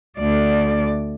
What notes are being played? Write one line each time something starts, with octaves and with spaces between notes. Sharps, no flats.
D2 D5